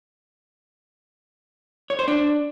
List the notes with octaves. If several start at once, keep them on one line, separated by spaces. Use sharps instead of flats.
C#5
C5
D4